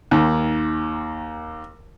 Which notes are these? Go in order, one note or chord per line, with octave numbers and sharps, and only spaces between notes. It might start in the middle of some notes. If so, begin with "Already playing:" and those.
D#2 D#3